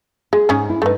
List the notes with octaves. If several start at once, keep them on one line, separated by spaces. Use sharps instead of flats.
G#3 G#4
G#2 C#4 D#4 G#4
E4
G2 A3 C#4 D#4 B4